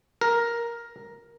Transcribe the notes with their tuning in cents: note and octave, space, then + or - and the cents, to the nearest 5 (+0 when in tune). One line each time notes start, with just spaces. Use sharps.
A#4 +5